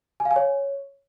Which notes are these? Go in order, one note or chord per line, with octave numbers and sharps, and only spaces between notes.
G#5
F5
G#5
C#5